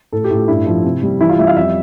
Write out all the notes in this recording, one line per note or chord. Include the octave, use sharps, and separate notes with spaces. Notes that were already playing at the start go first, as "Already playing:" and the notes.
A2 A4
G4
A2
F4
G2 E4
F3
C3
G3
E3 E4
F4
G3 E5
F5
F2 E5